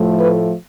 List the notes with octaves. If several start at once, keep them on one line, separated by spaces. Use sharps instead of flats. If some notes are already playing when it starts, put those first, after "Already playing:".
Already playing: A2 F3 A3
B4